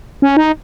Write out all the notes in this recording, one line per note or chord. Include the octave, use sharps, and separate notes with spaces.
C#4
D#4